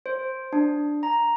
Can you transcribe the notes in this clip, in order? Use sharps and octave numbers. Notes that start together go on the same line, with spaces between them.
C5
D4
A#5